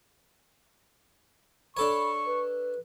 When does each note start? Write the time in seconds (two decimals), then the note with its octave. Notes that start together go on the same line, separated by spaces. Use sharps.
1.77 D4 A4 C#5 B5 C#6
2.26 B4